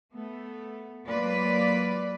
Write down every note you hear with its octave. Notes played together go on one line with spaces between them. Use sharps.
A3 B3
F#3 G#3 A#3 F4 B4 D5